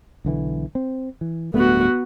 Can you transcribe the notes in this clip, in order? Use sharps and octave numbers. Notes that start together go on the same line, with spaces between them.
B1 D3 E3
C4
E3
D1 G2 A3 B3 F#4